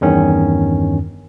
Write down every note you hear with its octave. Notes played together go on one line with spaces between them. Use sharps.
E2 G2 D#3 C#4